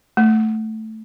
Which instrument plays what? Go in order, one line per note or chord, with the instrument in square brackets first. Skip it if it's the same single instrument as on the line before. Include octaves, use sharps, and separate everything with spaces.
[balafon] A3